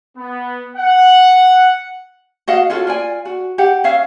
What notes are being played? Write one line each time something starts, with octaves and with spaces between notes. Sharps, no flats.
B3
F#5
F#4 D#5 F5 F#5
C#4 F4 F#4 A4
F4 D5 G#5
F#4
G4 F#5
C#4 E5 F5